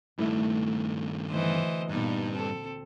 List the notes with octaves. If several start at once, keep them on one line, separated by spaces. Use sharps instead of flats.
G2 D#3 A3 B3 E4
D2 E3 C5 D#5
G2 A#2 B3 D#4
C4 A4